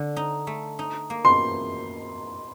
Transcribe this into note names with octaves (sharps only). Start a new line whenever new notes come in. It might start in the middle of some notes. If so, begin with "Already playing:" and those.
Already playing: D3
D#4
A3
D#4
A#3
C6